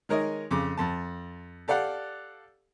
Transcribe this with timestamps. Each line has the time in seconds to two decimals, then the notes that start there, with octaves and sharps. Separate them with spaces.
0.09 D#3 G#3 A#4 C#5 D#5
0.51 F2 C#3 D6
0.77 F2 A5
1.68 G4 A4 D5 F5 F#5